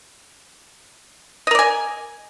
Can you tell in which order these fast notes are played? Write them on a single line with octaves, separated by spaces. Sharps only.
D#5 A#4 D5 G#5